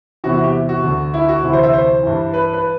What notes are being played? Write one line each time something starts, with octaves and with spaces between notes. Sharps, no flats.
E2 C3 E3 F#4
F#4
G4
F#4
D2 D3
E4
F#4
D2 C3 E3 E4
C5
E5
C5
G2 E3
B4
B4